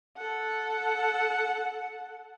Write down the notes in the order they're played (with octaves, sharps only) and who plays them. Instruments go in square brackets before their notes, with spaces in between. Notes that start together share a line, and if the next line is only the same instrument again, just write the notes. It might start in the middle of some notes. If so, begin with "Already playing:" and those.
[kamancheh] A4 F#5